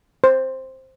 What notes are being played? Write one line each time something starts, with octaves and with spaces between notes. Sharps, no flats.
C5